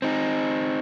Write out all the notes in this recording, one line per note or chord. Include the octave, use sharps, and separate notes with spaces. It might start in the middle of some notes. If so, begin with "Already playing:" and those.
C4 D#4